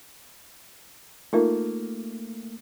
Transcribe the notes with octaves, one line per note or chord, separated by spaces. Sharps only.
A3 A#3 D#4 F4 A#4